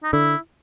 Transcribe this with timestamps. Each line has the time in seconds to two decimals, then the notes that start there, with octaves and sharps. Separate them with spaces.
0.03 D#4
0.13 D3 E4